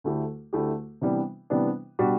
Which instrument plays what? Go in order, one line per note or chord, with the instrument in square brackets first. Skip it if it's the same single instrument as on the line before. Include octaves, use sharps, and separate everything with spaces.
[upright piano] D2 D3 A3 E4 G4
D2 D3 A3 E4 G4
C3 E3 G3 B3 D4
C3 E3 G3 B3 D4
B2 G3 D4 F#4